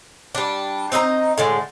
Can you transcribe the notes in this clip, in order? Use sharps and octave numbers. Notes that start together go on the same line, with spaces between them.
G3 D4
C4 D#4 D#5 A#5
A2 D3 G#3